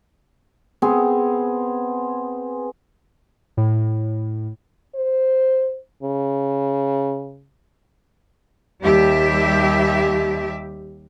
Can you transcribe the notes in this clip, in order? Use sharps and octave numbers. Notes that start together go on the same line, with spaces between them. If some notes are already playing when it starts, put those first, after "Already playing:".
B3 C4 G#4
A2
C5
C#3
D#2 G3 G4 E5